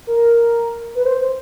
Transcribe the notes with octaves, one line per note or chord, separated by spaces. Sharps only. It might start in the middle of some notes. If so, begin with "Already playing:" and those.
A#4
B4
C5